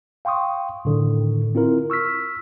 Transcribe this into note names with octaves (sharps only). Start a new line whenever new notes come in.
F5 G5 C6 C#6 D#6
A2 D3 D#3
C4 E4 F4 A#4
C#6 E6 F6 B6